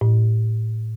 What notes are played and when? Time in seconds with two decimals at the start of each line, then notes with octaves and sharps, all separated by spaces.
0.01 A2